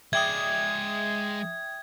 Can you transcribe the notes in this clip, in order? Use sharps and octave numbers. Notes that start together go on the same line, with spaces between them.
G#3 D5 E5 G5 D#6 G#6